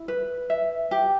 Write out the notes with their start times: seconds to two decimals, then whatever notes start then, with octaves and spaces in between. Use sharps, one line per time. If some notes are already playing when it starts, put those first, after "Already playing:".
Already playing: E4
0.08 B4
0.50 E5
0.91 G4